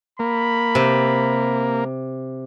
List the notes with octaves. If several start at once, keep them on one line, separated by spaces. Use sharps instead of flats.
A#3 B5
C3